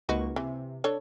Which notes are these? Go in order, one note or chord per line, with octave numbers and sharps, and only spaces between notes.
C#2 A#3 D#4 F#4 B4 C#6
C3 E3
D4 A4 C#5